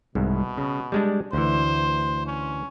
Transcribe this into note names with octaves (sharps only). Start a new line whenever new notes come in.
C2 G#2 B2
C#3
G3 G#3 D4
D2 E3 C5
C#4